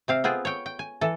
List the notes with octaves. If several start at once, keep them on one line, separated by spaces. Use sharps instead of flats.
C3 C4 F5
B3 C4 F4 G#4
C#5 G5
G5
G#5
E3 A4